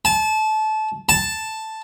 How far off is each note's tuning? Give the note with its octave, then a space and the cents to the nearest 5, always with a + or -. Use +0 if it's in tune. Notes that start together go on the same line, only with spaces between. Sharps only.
A5 -25
A5 +0